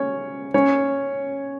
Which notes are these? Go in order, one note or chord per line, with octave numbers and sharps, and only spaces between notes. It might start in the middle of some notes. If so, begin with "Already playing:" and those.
Already playing: C#4 C#5
C#4 C#5